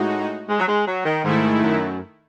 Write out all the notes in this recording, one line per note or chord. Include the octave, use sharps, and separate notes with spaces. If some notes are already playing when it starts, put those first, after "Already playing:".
Already playing: A2 G#3 D#4 F#4
G#3
F#3
G#3
F#3
D#3
G#2 D#3 A3 E4
F#2